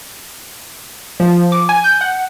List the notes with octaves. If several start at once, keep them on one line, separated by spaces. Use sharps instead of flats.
F3
D6
G#5
G6
F#5